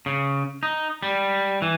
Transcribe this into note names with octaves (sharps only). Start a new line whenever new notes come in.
C#3
D#4
G3
E3